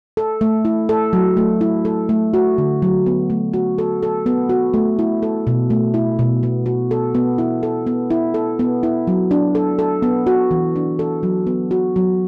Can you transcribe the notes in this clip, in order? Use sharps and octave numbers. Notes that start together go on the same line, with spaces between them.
A4
A3
E4
A4
F#3
A3
E4
A4
A3
F#4
D3
F#3
B3
A3
F#4
A4
A4
B3
F#4
A3
E4
A4
B2
A3
E4
B2
B3
F#4
A4
B3
E4
A4
B3
E4
A4
B3
E4
F#3
D4
A4
A4
B3
F#4
E3
D4
A4
F#3
B3
F#4
F#3